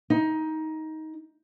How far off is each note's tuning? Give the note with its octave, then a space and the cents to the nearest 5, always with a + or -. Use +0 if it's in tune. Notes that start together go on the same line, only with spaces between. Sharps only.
D#4 +15